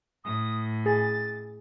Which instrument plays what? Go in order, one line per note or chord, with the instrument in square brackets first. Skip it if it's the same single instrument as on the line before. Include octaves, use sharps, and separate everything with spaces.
[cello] A2 [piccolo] D#6
[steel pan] G#4 [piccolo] A6